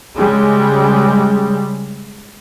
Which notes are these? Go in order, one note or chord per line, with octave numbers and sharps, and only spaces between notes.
C#3 G3 G#3